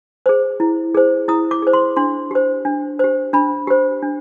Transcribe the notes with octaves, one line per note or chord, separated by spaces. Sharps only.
G#4 C5
E4
G#4 C5
E4 D#6
D6
G#4 C5
C6
D4 C6
G4 C5
D4
G4 C5
D4 B5
G4 C5
D4